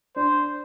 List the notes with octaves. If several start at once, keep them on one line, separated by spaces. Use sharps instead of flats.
D4 C5